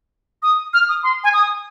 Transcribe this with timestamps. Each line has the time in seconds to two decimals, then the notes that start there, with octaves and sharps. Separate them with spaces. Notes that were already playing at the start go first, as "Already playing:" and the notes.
0.43 D#6
0.74 F6
0.89 D#6
1.03 C6
1.24 G#5
1.33 D#6